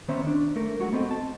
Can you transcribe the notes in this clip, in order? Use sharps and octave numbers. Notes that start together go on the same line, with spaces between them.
D#3 B3 C#4 C5 C#5 E5
D4
A3 A#4
G#3 F#4 F#5
B3 C4 A4 D#5
A5